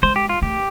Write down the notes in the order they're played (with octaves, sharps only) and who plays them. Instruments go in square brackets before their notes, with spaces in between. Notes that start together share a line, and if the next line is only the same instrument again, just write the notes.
[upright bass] G#3 [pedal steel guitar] C5
[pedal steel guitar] G4
F4
[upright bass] A3 [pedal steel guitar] G4